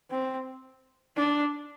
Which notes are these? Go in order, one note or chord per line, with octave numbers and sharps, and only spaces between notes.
C4
D4